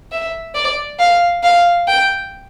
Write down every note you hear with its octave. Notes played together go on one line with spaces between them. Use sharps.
E5
D5
F5
F5
G5